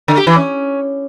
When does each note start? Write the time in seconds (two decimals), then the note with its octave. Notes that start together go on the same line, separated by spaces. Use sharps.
0.08 D3
0.17 G4
0.27 E3
0.36 C#4